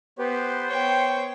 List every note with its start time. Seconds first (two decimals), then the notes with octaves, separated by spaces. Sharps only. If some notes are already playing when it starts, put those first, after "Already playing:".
0.19 B3 G4 B4 C5
0.69 B3 C#5 G5 C#6